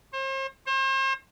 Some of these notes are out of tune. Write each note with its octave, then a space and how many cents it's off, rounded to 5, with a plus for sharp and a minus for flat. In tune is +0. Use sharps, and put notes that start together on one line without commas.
C5 +40
C5 +40